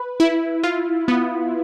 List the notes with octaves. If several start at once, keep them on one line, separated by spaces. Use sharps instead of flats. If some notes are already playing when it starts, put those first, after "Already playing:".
Already playing: B4
E4
F4
B3